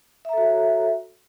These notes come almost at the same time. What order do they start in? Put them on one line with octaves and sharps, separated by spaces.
E5 A#5 A4 F#4 C#5